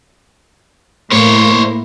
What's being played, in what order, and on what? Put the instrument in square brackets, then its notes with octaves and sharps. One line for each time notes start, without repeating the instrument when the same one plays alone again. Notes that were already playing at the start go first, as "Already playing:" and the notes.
[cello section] A2 A#3 E4 [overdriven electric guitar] C5 C#5